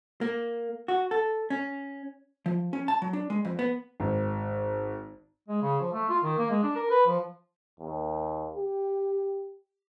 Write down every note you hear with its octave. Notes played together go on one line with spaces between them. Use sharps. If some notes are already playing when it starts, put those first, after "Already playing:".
A#3
F#4
A4
C#4
F3
C#4
A5
F#3
D4
G#3
F2
B3
G#1
G#3
C#3
F3
A3
F4
D#3
A#3
G#3
D4
A#4
B4
F3
D#2
G4